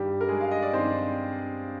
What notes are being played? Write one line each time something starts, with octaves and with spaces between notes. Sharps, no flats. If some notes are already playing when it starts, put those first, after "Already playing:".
Already playing: G2 D#3 G3 G4
A#4
G#3 G#4
F5
D#5
D5
G2 D#3 G3 C4 C5